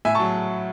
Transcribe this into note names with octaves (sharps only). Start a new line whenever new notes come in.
A2 E5 G#5
A5 C#6
F#3